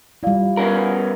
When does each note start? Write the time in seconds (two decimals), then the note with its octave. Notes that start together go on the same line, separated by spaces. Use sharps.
0.23 G3 E4 F4 D5 F5
0.57 B3 C#4 A#4